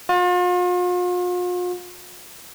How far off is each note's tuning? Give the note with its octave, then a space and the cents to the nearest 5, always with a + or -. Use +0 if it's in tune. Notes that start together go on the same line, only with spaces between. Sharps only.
F4 +40